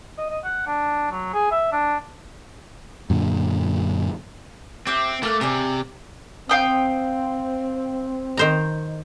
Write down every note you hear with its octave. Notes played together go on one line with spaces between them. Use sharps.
D#5
D#5
F#5
D4
F#3
G#4
E5
D4
F#2 A#2 D3
C4 G4 E5 F#6
A3 A#3 F6 F#6
C3 C4 G#4 D5
C4 F5 G5 D#6
D#3 C5 A#5